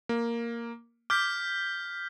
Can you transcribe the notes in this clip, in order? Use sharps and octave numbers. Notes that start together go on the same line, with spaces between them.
A#3
D6 F6 G6 B6